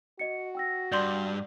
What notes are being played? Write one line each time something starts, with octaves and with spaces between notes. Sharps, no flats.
F#4 D#5 C#7
G5 E6 A#6
G2 D5 C6 G6 F#7